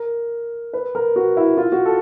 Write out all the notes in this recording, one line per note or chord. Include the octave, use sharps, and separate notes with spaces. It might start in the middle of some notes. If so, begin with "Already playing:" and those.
Already playing: A#4
B4
A#4
F#4
E4
F4
F#4
A4